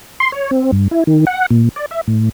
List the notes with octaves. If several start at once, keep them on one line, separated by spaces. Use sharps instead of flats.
C6
C#5
C4
G2
E4
D#3
F#5
A#2
D5
E5
A2